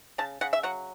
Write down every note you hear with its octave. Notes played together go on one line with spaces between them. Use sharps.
C#3 A5
C#3 F#5
E5
F#3 F#5